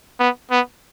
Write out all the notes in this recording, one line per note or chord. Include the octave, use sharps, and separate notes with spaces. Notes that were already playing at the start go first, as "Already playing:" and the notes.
B3
B3